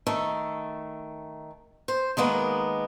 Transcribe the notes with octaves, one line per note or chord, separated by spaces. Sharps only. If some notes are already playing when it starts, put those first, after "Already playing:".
D#3 A3
C5
D#3 G#3 A#3 B3